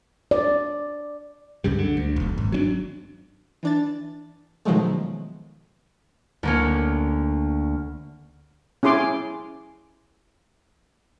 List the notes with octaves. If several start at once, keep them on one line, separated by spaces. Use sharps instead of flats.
D5
C#2 G2 C#3 G3
D3
D2
E1 B1
G#1
F#3 C#4 D4
E3 D4 A6
B2 D#3 F3 F#3 G#3 A3
D2 A#3 C#4
C#4 E4 G#4 C6 D6